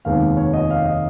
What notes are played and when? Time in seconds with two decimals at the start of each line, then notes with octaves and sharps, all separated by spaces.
0.05 F1 D#2 D#3 G#3 B3 F5
0.37 C#5
0.53 D#5
0.70 F5
0.86 D#5